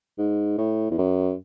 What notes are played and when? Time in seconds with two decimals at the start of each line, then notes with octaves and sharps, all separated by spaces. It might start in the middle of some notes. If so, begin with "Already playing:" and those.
0.18 G#2
0.58 A2
0.91 E2
0.98 F#2